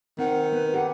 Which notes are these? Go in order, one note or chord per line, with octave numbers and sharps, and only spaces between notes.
D#3 C4 F#5
B3 B4
G4 A4 B4 F#5